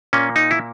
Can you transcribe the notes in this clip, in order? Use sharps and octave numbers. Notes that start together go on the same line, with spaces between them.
A#2 A#3 C#4
D#4
E4